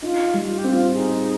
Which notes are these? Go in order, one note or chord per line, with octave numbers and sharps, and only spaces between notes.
D#4 F4
G3
F4
G4
C4 F4
D#4 G#4